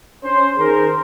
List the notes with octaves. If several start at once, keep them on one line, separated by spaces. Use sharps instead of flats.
C#4 C5
D#3 G#4 A#4 C5